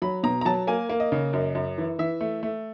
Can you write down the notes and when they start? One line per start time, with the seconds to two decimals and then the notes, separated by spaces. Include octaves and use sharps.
0.02 F#3 B5
0.23 B2 A#5
0.41 A#5
0.45 F#3 A5
0.67 A#3 G#5
0.90 A#3
1.00 D#5
1.12 C#3
1.33 F#2
1.55 F#2
1.78 E3
1.99 E3 E5
2.21 A3
2.43 A3